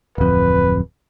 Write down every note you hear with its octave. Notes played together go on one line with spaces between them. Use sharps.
D1 F2 B4